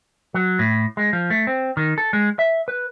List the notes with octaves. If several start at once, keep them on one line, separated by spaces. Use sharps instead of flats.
F#3
A2
G#3
F3
A3
C4
D#3
A4
G#3
E5
B4